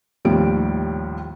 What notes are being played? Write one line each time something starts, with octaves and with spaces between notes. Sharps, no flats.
D#2 A2 F3 G3 D7